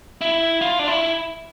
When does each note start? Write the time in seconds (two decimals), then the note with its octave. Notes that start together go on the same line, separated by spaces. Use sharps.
0.21 E4
0.61 F4
0.79 D4
0.88 E4